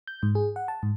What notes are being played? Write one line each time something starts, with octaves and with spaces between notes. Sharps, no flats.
G6
G#2
G#4
F#5
A5
G#2